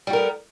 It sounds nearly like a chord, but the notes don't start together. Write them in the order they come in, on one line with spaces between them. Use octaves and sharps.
G3 F#4 A#4 B3